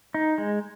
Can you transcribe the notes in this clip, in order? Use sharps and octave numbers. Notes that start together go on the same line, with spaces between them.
D#4
G#3